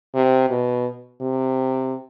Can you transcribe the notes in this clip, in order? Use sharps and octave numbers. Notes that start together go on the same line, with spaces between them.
C3
B2
C3